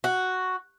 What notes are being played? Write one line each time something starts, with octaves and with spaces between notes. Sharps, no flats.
F#4